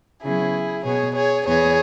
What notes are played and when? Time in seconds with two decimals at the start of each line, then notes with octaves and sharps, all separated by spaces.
0.23 C#3 F#3 B3 E4 G#4
0.84 B2 B3 G#4 C#5
1.15 G#4 C#5
1.45 E2 E3 B3 G#4 C#5